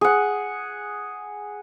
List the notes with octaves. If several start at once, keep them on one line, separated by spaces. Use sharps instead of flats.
G#4 F#5